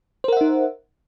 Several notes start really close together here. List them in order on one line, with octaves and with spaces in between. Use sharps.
C5 A#4 F#5 E5 D#4